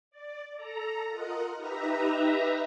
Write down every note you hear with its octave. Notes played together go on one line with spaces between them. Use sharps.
D5
A4 A#5
F4 A#4 D#5 F#5
D#4 G4 B4 E5 A#5